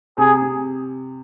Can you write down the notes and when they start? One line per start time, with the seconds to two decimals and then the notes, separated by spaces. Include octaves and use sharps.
0.18 C3 G#4
0.42 C3